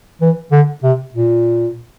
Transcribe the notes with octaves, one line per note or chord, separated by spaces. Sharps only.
E3
D3
C3
A#2